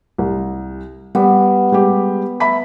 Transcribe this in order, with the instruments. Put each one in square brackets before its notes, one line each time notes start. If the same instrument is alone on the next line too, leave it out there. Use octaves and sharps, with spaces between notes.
[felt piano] C2
[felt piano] G3 [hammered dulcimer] B3
[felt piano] G3 G#3 G4
E5 B5 B6